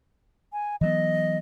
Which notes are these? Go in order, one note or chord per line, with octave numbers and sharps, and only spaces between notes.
G#5
E3 F#3 B3 D#5